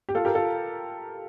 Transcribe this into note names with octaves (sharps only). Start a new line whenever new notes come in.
G4
F4 A4
G4 A#4
F4 A4